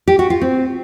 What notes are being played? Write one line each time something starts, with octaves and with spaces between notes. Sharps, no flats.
G4
F#4
F4
C4